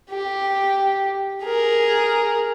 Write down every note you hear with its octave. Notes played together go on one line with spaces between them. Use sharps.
G4
G#4 A#4